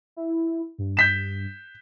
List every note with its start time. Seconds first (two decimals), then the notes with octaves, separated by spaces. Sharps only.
0.16 E4
0.78 G2
0.97 G6 B6 E7